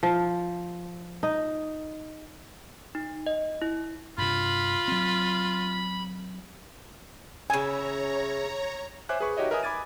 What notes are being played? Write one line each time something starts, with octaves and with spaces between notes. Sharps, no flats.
F3
D#4
D#4
D#5
E4
G2 C3 F4 B5
F#3 C4
C#3 C#4 E4 C#5 G#5 A#5
C5 C#5 E5 G#5 D6 F#6
G#4 B4 C#6
D#4 F#4 G4 C#5 D#5 E5
A#4 B4 D#5 E5 G#5 D#6
G#5 B5 D6 G#6 A6 D#7